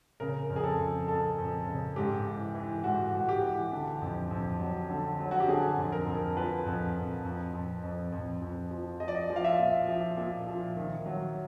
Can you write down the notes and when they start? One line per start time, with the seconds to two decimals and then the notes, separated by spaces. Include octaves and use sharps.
0.20 C#3 A#4
0.49 F2
0.56 G#4
0.64 A4
0.79 F2
1.08 F2 A4
1.38 F2
1.67 C#3
1.96 G#2 G4
2.25 E3
2.55 E3
2.84 G#2 F#4
3.14 G#2 F#4
3.29 G4
3.42 E3
3.72 D3
4.02 F2
4.31 F2
4.60 F#3
4.89 D3
5.19 F#3
5.31 F#4
5.40 G4
5.48 D3 G#4
5.78 F2
5.92 A#4
6.07 F2
6.36 F3 B4
6.66 F2
6.95 F2
7.24 F2
7.54 F2
7.83 F2
8.12 F2
8.42 F2
8.71 F3
9.00 F3 D#5
9.08 D5
9.15 D#5
9.30 F3
9.36 F5
9.44 E5
9.59 A#2
9.89 F3
10.17 A#2
10.47 F3
10.76 D#3
11.06 F#3